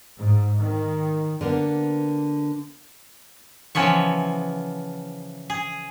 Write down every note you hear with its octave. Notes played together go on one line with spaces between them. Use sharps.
G#2
D#3
D3 A#3 B3
C#3 E3 F3 B3 C#5
G#4